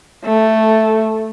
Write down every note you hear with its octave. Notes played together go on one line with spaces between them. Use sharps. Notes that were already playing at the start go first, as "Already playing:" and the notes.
A3